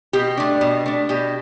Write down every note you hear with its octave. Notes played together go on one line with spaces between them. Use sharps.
B2 G4
A3 D4
B2
A3 D4
B2 G4